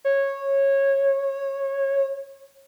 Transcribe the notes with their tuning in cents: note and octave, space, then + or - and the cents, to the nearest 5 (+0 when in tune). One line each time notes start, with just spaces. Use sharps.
C#5 -15